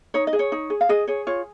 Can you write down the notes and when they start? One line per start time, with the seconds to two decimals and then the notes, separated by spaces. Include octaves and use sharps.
0.14 D#4 C#5
0.27 D#5
0.33 G#4
0.39 C#5
0.52 D#4
0.70 G#4
0.81 F5
0.89 G#4 D#5
1.08 G#4 C#5
1.27 F4 C#5